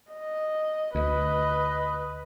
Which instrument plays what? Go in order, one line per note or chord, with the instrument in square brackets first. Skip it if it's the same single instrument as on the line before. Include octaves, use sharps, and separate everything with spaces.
[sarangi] D#5
[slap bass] D2 [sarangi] B4 [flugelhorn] D#5